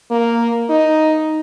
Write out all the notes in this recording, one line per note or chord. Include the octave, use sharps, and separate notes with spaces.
A#3
D#4